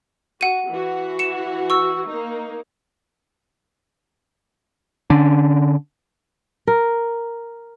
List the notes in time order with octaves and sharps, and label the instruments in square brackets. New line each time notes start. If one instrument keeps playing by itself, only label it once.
[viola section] F#4 [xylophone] F#5 D#7
[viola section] E3 F#4
[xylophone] C#7 E7
C#6 E6
[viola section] A#3 D#4
[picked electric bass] D3 C#4 D4
[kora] A#4